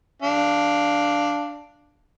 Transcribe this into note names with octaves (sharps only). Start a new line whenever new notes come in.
D4 F5